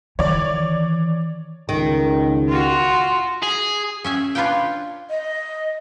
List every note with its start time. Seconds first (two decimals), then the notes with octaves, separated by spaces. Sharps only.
0.19 D#3 E3 C#5 D5
1.69 C#2 D#3
2.49 F4 F#4
3.43 G#4
4.04 C#4 E5 G#5
4.35 D4 F4 B4 C#5 F5 G5
5.10 D#5